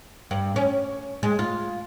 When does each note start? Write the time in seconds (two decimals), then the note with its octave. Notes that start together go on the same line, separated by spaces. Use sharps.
0.31 G2
0.56 C#4
1.23 G#3
1.39 F4